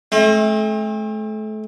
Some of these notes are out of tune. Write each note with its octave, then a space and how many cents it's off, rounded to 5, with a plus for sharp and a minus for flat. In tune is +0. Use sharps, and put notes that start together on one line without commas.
A3 -35 C4 +40